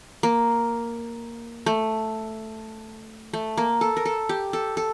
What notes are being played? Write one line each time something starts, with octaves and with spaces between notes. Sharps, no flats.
A#3
A3
A3
A#3
A4
A#4
A4
G4
A4
A4